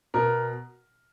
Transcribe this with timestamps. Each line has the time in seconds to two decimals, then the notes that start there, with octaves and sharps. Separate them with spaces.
0.14 B2 A#4